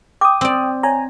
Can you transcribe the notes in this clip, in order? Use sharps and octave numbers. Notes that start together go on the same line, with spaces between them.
G5 D6 D#6
C4 D5
C#5 G#5 A#5